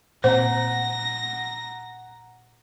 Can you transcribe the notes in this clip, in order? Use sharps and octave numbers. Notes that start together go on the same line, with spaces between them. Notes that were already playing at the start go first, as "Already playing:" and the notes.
A#2 C4 C5 F#5 A#5 A#6